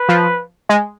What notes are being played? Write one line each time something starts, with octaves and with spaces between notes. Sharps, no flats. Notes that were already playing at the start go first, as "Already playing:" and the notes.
Already playing: B4
F3
G#3